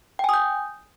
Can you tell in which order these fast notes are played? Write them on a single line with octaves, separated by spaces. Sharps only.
G5 G#5 D#6 G6